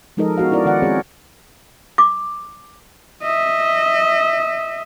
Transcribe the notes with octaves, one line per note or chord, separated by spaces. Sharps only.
F3 G#3 D#4 A4 A#4 D#5
B3 F#4 F5
C#4 E4 A#4 D5
D#3 D5 F#5
G#3 C4 C#4 G#4 C#5
D6
D#5 E5